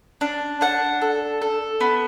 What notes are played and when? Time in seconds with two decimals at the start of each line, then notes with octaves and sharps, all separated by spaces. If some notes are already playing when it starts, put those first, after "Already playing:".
0.21 D4
0.61 D4 F#5
1.01 A4
1.42 A4
1.81 B3